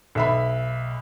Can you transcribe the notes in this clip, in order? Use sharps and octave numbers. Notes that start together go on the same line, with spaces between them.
B1 E5 B5